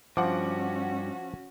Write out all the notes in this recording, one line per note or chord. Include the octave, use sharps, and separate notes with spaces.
G2 F3 C#4 F#4 F#5 D6